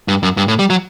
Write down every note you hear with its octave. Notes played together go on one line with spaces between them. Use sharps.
G2
F#2
G2
A2
G3
F#3